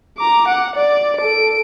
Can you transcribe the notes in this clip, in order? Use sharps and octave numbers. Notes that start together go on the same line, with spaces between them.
A#5 D6
F#5
D5
A4 D7